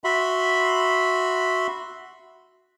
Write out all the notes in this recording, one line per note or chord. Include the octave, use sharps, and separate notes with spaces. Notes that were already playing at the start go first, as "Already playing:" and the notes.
F#4 E5 B5 C6